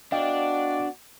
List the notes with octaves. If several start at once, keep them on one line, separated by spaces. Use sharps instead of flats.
B3 D4 F#4 D5 D#5 F5 G5